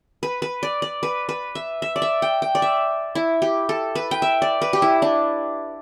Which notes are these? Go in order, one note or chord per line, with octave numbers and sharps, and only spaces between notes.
B4
B4
D5
D5
B4
B4
E5
E5
D5
E5
G5
G5
D5
E5
E4
G4
A4
B4
G5
E5
D5
B4
G4
E4
D4